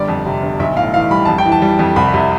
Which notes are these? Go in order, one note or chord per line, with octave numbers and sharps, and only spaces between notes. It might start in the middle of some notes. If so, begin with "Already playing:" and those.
Already playing: G1 G3 D5
F2
C3
G1
B1 E5
A2 F5
E3 F5
G3 B5
F2 A5
G5
E3
A5
G3
F2
C2 B5
C3